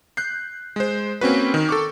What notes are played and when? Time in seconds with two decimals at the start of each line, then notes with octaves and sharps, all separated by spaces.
0.17 F#6 G6 C7
0.76 G#3 C5
1.21 A#3 C4 C#4 F#4 B4
1.54 D#3
1.69 A4 C#6 D6